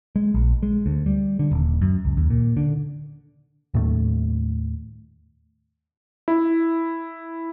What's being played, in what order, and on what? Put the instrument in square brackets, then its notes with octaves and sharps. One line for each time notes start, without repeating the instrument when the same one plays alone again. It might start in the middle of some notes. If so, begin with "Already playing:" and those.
[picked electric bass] G#3
A#1
G#3
D2
G3
D3
D#1
F#2
C#2
D#2
A#2
D3
D#2 A2 A3
[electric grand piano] E4